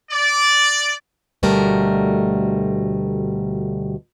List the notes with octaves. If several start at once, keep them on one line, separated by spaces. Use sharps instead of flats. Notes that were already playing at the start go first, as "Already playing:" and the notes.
D5
D2 B2 G3 A3 A#4